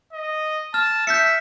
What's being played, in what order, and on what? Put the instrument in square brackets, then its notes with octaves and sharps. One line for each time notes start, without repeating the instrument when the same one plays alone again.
[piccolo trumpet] D#5
[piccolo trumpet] A5 [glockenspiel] F6
[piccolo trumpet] E5 [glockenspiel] G6 B6 C#7